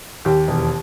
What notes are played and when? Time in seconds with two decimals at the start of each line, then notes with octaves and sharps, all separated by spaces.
0.25 D#2 G4
0.48 E1